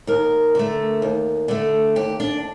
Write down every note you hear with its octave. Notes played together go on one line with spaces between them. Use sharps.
D#2 A#4
D3 A3
D#2
D3 A3
D#2 G4
D4